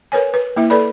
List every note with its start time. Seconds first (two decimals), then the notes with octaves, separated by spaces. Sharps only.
0.12 A#4 B4 C#5 G#5
0.34 B4
0.56 A#3 E4 E5
0.70 A4 B4 D5 B5